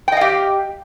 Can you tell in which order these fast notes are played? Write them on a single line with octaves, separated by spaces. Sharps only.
G5 D#5 F5 G4